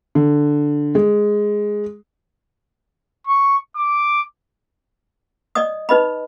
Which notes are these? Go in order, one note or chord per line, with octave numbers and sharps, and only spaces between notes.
D3
G#3
C#6
D6
D5 D#5 D#6
D#4 B4 D#5 B5